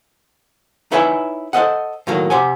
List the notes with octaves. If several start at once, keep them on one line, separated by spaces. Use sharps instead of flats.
D#4 E4 B4 C#5 E5 G#5
A4 C5 D#5 F#5
A2 D#3 F#3 A#3
C3 G4 C5 F#5 G#5